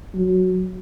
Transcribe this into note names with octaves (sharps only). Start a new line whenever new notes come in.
F#3